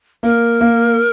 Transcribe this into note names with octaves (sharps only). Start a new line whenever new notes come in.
A#3 A#4
A#3